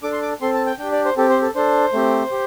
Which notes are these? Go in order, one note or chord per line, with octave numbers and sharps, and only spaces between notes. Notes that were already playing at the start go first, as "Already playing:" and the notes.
D4 A4 D6
C6
D6
C4 A4 C6
A5
G5
D4 G4 G5
D5
C5
C4 G4 A4
C5
A4
D4 A4 C5
A3 C4 G4
G4